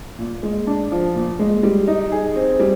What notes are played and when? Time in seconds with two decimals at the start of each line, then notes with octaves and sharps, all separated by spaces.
0.18 A#2
0.43 G#3
0.67 D4
0.92 F3
1.15 A#2
1.39 G#3
1.63 G3
1.88 D#4
2.12 G#4
2.36 C4
2.60 G3